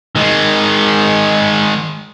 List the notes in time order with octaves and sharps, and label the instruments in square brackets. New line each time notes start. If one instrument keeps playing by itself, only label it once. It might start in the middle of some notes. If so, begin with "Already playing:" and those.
[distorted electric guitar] D#3 G#3